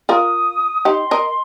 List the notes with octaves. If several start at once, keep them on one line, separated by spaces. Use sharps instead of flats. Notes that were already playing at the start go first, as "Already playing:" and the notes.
F4 A#4 D#6
D#4 G4 C6
A#4 D#5